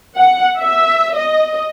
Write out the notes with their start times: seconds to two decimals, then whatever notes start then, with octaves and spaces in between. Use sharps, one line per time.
0.16 F#5
0.60 E5
1.14 D#5